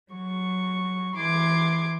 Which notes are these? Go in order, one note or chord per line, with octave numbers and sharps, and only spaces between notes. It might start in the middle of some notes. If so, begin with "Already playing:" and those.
F#3 C#6
E3 C6 D6 G#6